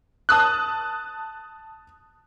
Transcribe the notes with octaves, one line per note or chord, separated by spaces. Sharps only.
A5 D#6 F#6